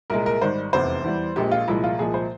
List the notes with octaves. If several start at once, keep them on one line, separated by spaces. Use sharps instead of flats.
C2 A#2 G#3 A#4
A#4
G#1 G#2 G3 C5
F1 E2 C3 C5
E2 E3 G3
A#1 A#2 G#3 G4
F4
C2 A#2 F3 G#3 E4
F4
C2 A#2 F3 G#3 G#4
C5